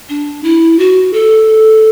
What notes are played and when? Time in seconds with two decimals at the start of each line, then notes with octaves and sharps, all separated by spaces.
0.09 D4
0.44 E4
0.79 F#4
1.13 A4